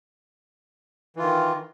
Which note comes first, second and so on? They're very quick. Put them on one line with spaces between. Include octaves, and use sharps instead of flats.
E3 F4 D#3